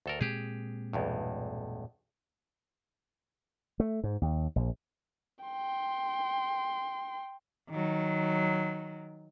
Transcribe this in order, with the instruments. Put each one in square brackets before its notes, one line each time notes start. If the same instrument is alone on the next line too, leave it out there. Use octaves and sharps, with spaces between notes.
[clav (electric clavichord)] D2 A4 A#4
[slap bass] A#2 G#3 C4 [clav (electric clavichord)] G4 G#4
[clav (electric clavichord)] B1 E2 G2
[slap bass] A3
G#2
D#2
A#1
[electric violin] G5 C6
[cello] D#3 F#3